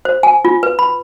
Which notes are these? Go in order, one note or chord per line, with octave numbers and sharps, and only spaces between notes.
C5
G#5
F4
B4
B5